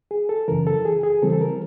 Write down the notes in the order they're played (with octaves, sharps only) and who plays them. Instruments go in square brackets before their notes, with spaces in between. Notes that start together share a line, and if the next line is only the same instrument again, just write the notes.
[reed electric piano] G#4
A4
F#2 C#3 E3 A#4
A4
G#4
G#4
C#3 E3 G3 C4 A4
A4
A#4